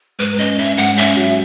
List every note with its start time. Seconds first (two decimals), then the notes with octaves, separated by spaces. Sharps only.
0.19 G#2 B4
0.38 C#4 D#5
0.58 C#4 E5
0.78 G#2 F#5
0.97 C#4 E5
1.16 F#3